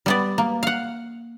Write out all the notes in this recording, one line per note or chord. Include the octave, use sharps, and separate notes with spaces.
G3 B3 D5
A#3
F5 F#5